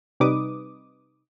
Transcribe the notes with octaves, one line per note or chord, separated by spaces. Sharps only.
C3 G3 D#4 B4 D6 D#6